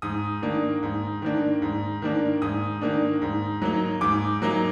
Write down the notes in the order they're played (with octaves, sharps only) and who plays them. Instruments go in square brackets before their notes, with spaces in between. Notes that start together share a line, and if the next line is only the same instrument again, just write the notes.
[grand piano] G#2 D#6
D#3 A#3 D4
G#2
D#3 A#3 D4
G#2
D#3 A#3 D4
G#2 D#6
D#3 A#3 D4
G#2
F#3 A#3 D#4
G#2 D6
F#3 A#3 D#4